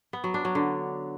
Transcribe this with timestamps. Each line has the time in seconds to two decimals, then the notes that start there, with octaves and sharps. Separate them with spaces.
0.13 B3
0.24 F#3
0.34 D4
0.45 F#3
0.55 D3